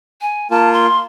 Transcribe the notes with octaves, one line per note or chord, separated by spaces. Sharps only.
G#5
A#3 F4 A5
C6